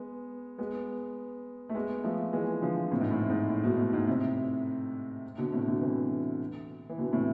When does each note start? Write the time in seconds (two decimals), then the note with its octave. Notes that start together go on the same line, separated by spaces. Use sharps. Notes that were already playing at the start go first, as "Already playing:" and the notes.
Already playing: G#3 B3
0.58 G#3 B3
1.69 A3
1.75 G#3 B3
2.04 F3 A3
2.33 E3 G#3
2.62 D3 F3
2.91 A2 C3
3.01 G#2
3.11 A2
3.29 G#2
3.49 A2
3.64 G#2 B2
3.79 A2
3.93 G#2 B2
4.07 A2 C3
5.38 B2 D3
5.53 A2 C3
5.67 B2 D3
5.81 C3 E3
6.89 E3
6.98 B2 D3
7.13 A2 C3